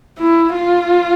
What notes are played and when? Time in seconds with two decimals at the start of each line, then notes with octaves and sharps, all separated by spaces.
0.19 E4
0.54 F4